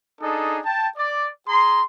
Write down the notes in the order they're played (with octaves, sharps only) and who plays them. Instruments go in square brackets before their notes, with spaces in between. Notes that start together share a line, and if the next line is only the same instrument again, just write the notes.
[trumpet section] D4 D#4 G#4 A4
G5 A5
D5
G#4 A#5 C6